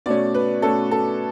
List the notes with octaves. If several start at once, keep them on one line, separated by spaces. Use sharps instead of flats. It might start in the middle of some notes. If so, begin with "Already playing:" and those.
B2 A3 C#4 D5
B4
B2 A3 C#4 A4
A4